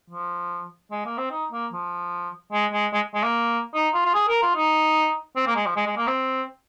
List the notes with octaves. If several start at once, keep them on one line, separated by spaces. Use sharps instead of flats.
F3
G#3
A#3
C4
D#4
A#3
F3
G#3
G#3
G#3
G#3
A#3
D#4
F4
F4
G#4
A#4
F4
D#4
C4
A#3
G#3
F3
G#3
G#3
A#3
C4